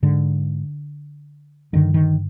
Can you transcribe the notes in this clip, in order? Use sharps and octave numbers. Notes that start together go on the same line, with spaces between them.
G#2 D3
G2 D3 D#3
D#3